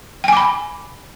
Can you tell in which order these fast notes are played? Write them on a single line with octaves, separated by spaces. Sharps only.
G5 G#5 D6 B5